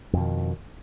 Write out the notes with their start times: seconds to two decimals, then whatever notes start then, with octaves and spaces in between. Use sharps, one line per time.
0.13 F2
0.17 B2
0.21 D#3